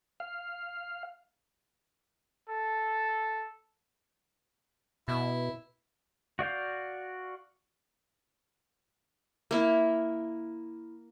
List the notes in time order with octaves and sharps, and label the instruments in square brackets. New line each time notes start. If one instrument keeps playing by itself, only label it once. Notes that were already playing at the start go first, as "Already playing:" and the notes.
[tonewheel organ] F5
[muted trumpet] A4
[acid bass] B2 [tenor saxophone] E4
[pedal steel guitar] F#4 D5 F5 G6
[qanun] A#3 E4